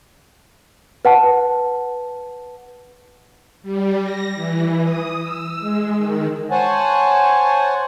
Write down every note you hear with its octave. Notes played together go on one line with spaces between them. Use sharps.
B4 F#5 A5
G3
A#6
E3
D#6
E6
G#3
D#3
C5 C#5 F#5 G#5 A5